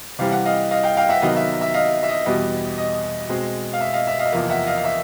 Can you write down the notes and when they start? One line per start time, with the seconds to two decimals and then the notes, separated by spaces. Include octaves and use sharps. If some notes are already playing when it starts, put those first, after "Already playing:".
0.19 C3 E3 G3 C4 F5
0.32 F#5
0.45 D#5 F5
0.71 D#5 F5
0.84 F5 G5
0.97 F5 G5
1.09 E5 F#5
1.22 C3 D#3 F#3 B3 D#5 F5
1.36 E5
1.61 E5
1.74 D#5 F5
2.03 E5
2.09 D#5
2.26 E2 B2 G3 B3 D#5
2.78 D#5
3.29 B2 G#3 C4
3.73 F5
3.81 E5
3.94 D#5 F5
4.07 E5
4.19 D#5 F5
4.26 E5
4.32 E2 C3 F3 A#3 D#5 F5
4.50 E5 F#5
4.67 D#5 F5
4.77 F5
4.84 E5